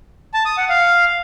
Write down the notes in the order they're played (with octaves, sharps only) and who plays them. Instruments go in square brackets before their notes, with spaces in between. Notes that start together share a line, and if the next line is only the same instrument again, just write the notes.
[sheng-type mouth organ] A5
D#6
F#5
F5